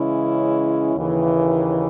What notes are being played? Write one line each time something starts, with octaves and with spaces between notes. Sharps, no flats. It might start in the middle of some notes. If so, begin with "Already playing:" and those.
Already playing: C#3 E3 G#3 C#4 E4
D#2 C#3 E3